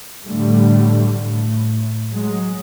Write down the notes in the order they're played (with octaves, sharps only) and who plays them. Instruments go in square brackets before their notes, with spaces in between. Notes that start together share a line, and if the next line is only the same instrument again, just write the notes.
[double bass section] A2 D3 G3 A3
A2
F#3 G#3